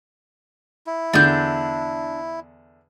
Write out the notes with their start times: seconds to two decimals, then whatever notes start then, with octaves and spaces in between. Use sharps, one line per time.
0.87 E4
1.13 E2 D3 D4 G6